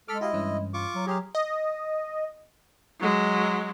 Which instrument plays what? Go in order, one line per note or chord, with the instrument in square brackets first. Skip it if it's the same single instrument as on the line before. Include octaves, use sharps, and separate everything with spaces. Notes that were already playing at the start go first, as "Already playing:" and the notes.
[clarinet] G#3 [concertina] A4 F6 [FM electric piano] D6 B6
[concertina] E4 D#5 [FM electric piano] F#4 G4 F5
[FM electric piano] G2 E3 C#4
[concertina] F4 C#6 D6
[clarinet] F#3
[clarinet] F#3 [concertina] G4 G#4 [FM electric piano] A#5 C6 F6
[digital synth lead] D#5
[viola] F#3 G#3